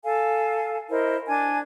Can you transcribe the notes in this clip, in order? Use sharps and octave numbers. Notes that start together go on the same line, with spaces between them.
A4 F5 G#5
E4 A#4 C5 D#5
D4 G#5 G#6